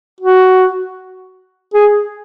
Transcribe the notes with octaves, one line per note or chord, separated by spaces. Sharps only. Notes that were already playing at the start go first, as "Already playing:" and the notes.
F#4
G#4